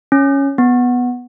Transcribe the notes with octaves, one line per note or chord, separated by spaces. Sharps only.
C#4
B3